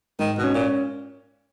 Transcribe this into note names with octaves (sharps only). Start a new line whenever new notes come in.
G#2 D#3
B2
C#4
A#2